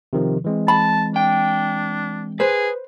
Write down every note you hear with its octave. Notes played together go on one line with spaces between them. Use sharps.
C3 D#3 F3
E3 G#3 C4
A5 B5
D4 G5
G#4 B4 C5